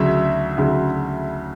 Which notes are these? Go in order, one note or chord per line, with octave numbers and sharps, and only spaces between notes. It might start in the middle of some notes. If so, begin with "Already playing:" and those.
Already playing: D2 C#3 F#3 E5
D2 C#3 F#3